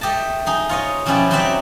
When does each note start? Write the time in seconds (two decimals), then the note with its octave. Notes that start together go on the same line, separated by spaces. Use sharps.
0.01 A3 G4 D#5 A5
0.46 D#4 G#4
0.69 F4 C#5 D#5
1.06 B2 F3 C#4 E4 G4 D5
1.31 F#3 C4 D#4 C#5 D5 E5